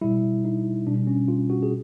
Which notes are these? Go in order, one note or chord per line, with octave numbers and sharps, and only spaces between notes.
B2 G3 E4
D#4
B2 G3 D4
C#4
F4
F#4
G#4